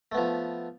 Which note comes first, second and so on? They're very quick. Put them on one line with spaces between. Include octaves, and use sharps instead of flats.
A3 B3 F3